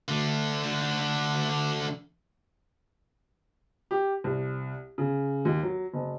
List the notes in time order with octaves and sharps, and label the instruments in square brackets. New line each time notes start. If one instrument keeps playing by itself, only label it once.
[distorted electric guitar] D3 A3
[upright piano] G4
C2
C#3
D#2
F#3
F#1